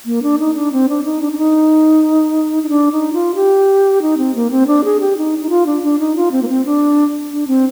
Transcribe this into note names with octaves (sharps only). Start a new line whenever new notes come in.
A#3
D4
D#4
D4
C4
D4
D#4
D4
D4
D#4
D#4
D4
D#4
F4
G4
D#4
C4
A#3
C4
D4
G#4
G4
D#4
D#4
F4
D4
D4
D#4
F4
C4
A#3
C4
D4
D4
C4